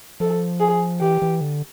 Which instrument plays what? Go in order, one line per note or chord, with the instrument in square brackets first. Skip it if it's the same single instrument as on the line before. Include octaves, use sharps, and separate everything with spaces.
[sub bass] F3 [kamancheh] A4
[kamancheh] G#4
[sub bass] E3 [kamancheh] G4
[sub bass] E3
D3